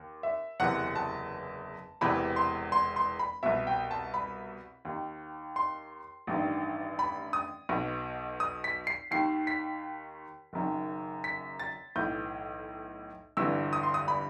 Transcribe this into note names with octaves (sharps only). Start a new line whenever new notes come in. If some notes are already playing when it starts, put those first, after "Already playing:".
Already playing: D#2
E5
F#1 E2 C3 E3 F#5
A5
E1 E2 C3 E3 B5
C6
C6
C6
B5
C2 B2 E5
G5
A5
B5
D#2 D#3
C6
A1 G2 D#3
B5
D#6
B1 B2
D#6
B6
C7
D#2 D#3 C7
B6
F#1 F#2 D#3
B6
A6
B1 A2 E3 G6
G1 G2 E3 E6
D#6
C6
D#6
B5